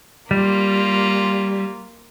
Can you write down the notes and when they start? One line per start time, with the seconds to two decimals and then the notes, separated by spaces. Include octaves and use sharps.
0.31 G3 A#3 F4